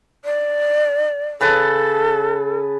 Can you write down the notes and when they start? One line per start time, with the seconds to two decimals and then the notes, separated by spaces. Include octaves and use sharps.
0.25 D5
1.41 C#3 A4 B4 A5